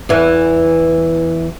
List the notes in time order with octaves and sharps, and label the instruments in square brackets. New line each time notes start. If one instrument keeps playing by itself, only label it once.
[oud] E2 E3